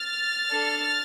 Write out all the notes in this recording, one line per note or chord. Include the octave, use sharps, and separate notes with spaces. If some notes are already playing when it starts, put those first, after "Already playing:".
Already playing: F6 A6
D4 A4